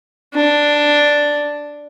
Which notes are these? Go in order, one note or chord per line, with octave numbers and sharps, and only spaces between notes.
D4